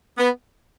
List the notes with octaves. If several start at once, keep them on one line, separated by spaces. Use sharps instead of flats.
B3